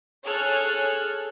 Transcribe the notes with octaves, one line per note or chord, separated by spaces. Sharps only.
G#4 A4 C#5 F6 F#6 G#6